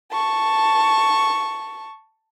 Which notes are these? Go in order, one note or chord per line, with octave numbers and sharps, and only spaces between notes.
A5 C#6